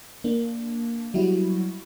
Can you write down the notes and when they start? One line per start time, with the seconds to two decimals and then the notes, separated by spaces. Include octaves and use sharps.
0.24 A#3 D4
1.14 F#3 G3 E4 F#4